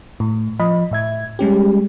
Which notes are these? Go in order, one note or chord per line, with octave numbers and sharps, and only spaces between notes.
A2
F3 D#5 B5
A2 E5 G#6
G3 G#3 C#4 G4